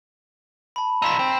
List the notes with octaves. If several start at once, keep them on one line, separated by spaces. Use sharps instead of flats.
A5 B5
D#4 F4 E6 B6
C4